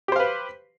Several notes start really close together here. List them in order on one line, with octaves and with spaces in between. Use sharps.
G4 C5 F5 B4